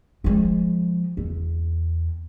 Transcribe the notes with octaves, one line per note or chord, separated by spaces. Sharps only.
F3 G#3
E2